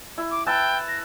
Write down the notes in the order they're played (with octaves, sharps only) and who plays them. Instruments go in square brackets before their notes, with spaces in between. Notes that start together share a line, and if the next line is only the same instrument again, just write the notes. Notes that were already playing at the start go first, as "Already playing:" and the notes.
[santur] E4
[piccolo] D6
[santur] B4 E5 A5 [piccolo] G5
[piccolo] A#6